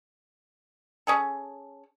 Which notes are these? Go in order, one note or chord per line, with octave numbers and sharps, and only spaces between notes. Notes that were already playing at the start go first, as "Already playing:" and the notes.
C#4 G#4 A4